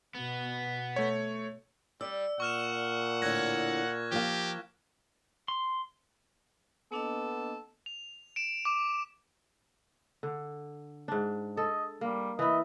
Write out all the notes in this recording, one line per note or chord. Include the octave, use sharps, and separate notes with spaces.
B2 B3
A3 C#5
G3 D5 E6
A#2 F#5 C#6 F6 E7
A2 D3 F#6 G#6 A#6
F3 A#3 G4 F5
C6
A#3 B3 D4 A4 D#5
F7
D7 E7
D6
D3
G#2 D4
A4 D#5
G3 A#3
E3 E4 D#5